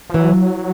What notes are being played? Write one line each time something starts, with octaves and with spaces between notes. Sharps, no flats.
F3
E3 F#3